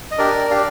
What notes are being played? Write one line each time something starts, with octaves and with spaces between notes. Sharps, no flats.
D#5
D4 G4 A#4 D5
D4 G4 D5 F5